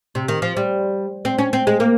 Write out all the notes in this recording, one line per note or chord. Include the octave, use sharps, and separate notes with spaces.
C3
D#3
F3
G3
C4
C#4
C4
G#3
A#3